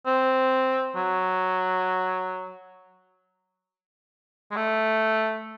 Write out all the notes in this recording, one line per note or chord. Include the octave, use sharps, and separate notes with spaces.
C4
F#3
G#3
A3